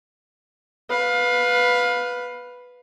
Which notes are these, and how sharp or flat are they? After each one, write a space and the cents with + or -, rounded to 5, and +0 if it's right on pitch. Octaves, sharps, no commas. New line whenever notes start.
B4 +0 F5 +20